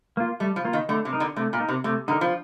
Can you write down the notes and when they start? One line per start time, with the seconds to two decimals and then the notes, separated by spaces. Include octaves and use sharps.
0.17 A#3 F4
0.40 G3 A3
0.56 F3
0.65 A#3 F4
0.73 D#3
0.89 D3 A3
1.05 C3
1.13 D#4 A#4
1.20 D3
1.36 C3 A3
1.53 A#2
1.60 D#4 A#4
1.69 C3
1.84 C3 A3
2.08 D3 D#4 A#4
2.21 F3